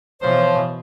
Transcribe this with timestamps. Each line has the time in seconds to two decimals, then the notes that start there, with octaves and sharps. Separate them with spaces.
0.21 B2 E3 F3 C5 C#5